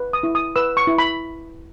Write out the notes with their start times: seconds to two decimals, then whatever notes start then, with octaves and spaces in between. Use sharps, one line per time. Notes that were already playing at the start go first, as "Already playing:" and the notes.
Already playing: B4
0.13 D#6
0.23 E4
0.35 D#6
0.56 B4 E6
0.77 C#6
0.87 E4
0.98 B5